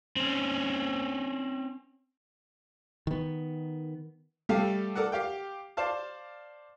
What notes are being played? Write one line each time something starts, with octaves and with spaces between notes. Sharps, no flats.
C4 C#4
D#3 B3
G3 A3 G4 A4 F5
A4 A#4 D5 F#5
G4 F5 G5
C5 D5 F5 A5